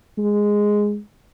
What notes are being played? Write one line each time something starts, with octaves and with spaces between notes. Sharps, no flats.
G#3